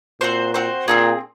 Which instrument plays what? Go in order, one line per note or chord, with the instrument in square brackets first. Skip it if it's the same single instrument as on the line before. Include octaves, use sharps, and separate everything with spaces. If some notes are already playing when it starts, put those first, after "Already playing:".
[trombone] A#2 [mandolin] C4 F#4 C5
[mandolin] C4 F#4 C5
[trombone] A#2 [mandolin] C4 D#4 G#4